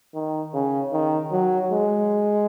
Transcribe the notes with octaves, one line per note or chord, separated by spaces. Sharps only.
D#3
C#3
D#3
F#3
G#3